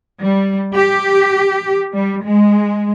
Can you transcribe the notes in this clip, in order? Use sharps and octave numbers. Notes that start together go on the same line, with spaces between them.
G3
G4
G3
G#3